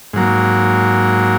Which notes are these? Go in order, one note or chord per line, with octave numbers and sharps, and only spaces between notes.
G#2 F#3 A#3